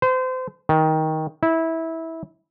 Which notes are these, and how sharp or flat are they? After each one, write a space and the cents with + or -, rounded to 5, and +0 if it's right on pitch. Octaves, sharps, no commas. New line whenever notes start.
C5 -30
D#3 +15
E4 -20